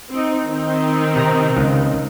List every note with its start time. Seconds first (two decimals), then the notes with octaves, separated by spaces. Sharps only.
0.10 C4 D#4
0.46 D#3 C4 D#4
1.16 C3 A#5
1.57 C#2